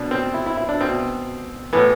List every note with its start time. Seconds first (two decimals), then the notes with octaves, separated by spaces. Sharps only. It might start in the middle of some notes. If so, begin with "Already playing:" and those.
Already playing: B2 D4
0.11 C4
0.34 E4
0.46 E4
0.57 E4
0.69 D4
0.81 B2 C4
1.73 A2 E3 B3